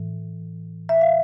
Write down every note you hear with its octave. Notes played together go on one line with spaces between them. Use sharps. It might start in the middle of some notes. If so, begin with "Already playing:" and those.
Already playing: A2 E3
E5
F5